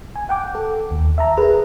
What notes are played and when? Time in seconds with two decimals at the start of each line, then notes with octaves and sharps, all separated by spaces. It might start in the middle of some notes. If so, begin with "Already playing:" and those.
0.16 G#5
0.29 F#5 G5 D6
0.55 A4
0.91 D#2
1.18 E5 A5 A#5
1.37 G#4 A#4 B4